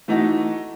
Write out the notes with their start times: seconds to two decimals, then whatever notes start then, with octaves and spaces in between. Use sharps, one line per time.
0.08 E3 A3 D#4 F#4